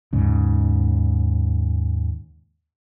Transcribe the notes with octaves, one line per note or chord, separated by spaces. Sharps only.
D#2 G#2 C#3